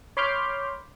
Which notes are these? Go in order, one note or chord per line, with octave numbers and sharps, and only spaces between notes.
C#5 B5 C6 D6 F6 G6